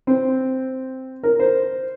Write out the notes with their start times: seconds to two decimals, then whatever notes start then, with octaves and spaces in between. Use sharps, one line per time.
0.07 C4
1.23 A#4
1.40 C5